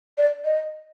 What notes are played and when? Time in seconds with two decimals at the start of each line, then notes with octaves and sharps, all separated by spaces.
0.17 D5
0.44 D#5